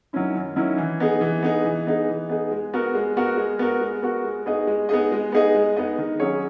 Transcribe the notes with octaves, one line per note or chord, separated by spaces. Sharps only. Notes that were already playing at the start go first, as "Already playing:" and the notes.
D#3 F#3 C#4 E4
F#2
D#3 F#3 C#4 E4
E3
B3 D#4 G#4
E3
B3 D#4 G#4
E3
B3 D#4 G#4
E3
B3 D#4 G#4
G#3
B3 F#4 A#4
G#3
B3 F#4 A#4
G#3
B3 F#4 A#4
G#3
B3 F#4 A#4
G#3
B3 D#4 G#4 D#5
G#3
B3 D#4 G#4 D#5
G#3
B3 D#4 G#4 D#5
G#3
B3 D#4 G#4 D#5
D#3
F#3 C#4 G#4 C#5